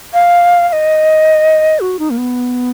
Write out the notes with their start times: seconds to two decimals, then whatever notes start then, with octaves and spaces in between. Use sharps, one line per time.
0.13 F5
0.69 F5
0.73 D#5
1.80 F#4
1.99 D#4
2.10 A#3
2.18 B3